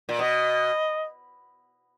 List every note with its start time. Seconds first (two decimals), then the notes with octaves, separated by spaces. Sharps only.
0.09 A#2
0.19 B2 D#5